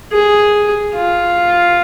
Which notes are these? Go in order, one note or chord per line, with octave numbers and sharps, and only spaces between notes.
G#4
F4